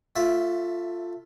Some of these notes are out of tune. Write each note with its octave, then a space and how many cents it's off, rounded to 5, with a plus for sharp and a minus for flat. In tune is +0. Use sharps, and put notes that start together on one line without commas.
A3 +15 F4 +0 E5 +0